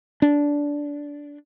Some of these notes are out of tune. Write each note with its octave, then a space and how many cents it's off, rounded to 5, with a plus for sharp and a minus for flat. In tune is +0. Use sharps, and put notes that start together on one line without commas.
D4 -15